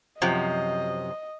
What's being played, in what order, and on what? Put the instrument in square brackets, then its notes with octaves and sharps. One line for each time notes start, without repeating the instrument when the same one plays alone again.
[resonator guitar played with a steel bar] F#2 C3 F3 [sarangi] D#5